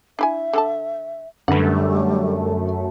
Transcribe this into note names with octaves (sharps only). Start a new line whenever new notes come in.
D4 E4 E5 G#5
D3 A4 A5
F#2 D3 G3 A3 B4 F#5